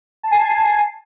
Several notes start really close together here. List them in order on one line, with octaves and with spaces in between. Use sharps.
A5 C7 G#5